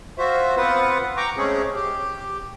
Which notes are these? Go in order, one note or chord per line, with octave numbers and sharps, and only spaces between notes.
F4 F#4 C5 E5
B3 C4 F4 B4 F#5
G5 A#5 C#6 D6
G#3 A3 C4 C#4 G#4
G4